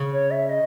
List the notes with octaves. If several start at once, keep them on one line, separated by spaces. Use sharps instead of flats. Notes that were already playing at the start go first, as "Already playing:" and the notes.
Already playing: C#3
C#5
E5
D#5